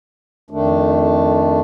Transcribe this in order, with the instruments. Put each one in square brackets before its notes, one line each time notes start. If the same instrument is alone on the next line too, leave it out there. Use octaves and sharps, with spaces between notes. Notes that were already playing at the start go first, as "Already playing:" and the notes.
[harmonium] F2 D#3 A3 D4